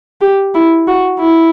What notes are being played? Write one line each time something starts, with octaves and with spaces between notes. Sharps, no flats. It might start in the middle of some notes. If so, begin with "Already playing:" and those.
G4
E4
F#4
E4